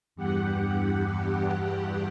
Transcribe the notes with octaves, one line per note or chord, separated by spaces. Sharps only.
E2 G2 G4 F#5